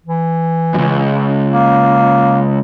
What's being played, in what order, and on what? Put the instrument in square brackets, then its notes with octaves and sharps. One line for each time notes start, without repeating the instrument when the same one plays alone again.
[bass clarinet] E3
[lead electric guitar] C#2 F#2
[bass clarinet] A#3